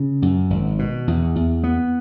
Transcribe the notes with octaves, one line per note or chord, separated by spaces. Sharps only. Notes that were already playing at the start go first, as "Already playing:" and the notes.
Already playing: C#3
F#2
G#1
B2
E2
E2
B3